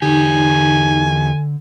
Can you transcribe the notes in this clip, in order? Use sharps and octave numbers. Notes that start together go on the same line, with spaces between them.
E2 D3 D#4 G4 G#5